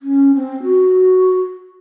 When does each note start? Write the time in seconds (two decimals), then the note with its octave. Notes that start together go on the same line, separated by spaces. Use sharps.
0.02 C#4
0.35 C4
0.63 F#4